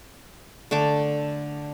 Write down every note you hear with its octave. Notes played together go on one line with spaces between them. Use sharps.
D3 A3 A5 D6